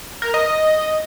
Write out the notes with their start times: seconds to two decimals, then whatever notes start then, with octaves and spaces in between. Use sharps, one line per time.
0.22 A#4
0.34 D#5
0.46 D#5